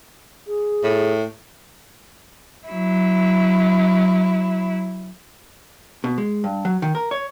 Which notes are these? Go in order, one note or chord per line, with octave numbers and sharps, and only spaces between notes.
G#4
A2
F#3 E4
B2
G#3
G2
F#3
D#3
A#4
C#5